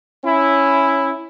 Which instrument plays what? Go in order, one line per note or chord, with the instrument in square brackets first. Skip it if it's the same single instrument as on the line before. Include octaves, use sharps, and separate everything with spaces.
[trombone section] C#4 E4